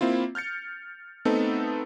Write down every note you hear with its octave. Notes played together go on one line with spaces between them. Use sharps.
A#3 C4 E4 F4
F6 G6 A6 C#7
A3 B3 C4 D#4 A4